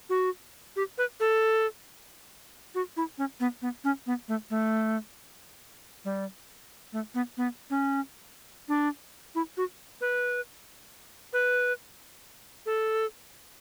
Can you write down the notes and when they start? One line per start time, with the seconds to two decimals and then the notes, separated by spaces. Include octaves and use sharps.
0.09 F#4
0.76 G4
0.98 B4
1.20 A4
2.75 F#4
2.97 E4
3.18 C#4
3.40 B3
3.62 B3
3.84 C#4
4.06 B3
4.28 A3
4.50 A3
6.05 G3
6.93 A3
7.14 B3
7.37 B3
7.70 C#4
8.68 D4
9.35 E4
9.57 F#4
10.01 B4
11.33 B4
12.66 A4